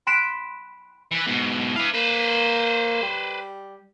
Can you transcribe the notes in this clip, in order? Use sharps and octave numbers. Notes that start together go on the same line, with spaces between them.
B5 C6 F#6 B6 D7 E7
E3 B4
G#2 B2
E4 B4 F5
A#3 B4 C5
G3